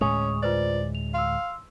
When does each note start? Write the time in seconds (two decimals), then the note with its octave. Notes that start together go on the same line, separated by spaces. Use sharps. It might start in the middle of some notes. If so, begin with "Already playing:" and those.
0.01 D2 A2 G#3 C#4 C#6 D#6 F7
0.43 F4 B4 C5 D5
0.95 F7
1.14 F5 C6 E6